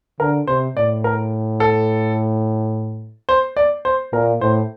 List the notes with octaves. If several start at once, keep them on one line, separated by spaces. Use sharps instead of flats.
D3 A#4
C3 C5
A2 D5
A#4
A4
C5
D5
C5
A#2 A#4
A2 C5